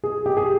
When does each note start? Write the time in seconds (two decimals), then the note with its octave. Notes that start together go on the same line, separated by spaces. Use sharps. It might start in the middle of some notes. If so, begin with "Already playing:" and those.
0.04 G#4
0.26 G4
0.37 G#4